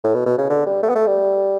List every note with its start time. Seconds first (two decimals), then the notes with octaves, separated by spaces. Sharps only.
0.04 A2
0.14 B2
0.26 B2
0.38 C#3
0.49 D3
0.66 G3
0.83 A3
0.89 B3
0.95 A3
1.07 G3